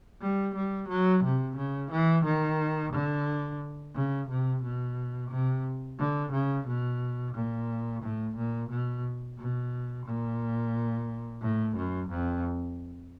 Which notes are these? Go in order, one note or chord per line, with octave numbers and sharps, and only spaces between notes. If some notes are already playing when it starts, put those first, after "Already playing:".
G3
G3
F#3
C3
C#3
E3
D#3
D3
C#3
C3
B2
C3
D3
C#3
B2
A#2
A2
A#2
B2
B2
A#2
A2
F#2
F2